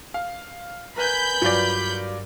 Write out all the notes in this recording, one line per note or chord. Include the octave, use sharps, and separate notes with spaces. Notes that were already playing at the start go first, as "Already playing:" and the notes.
F5
A#4 B4 G#5 B5 G6
G2 F#3 F4 D5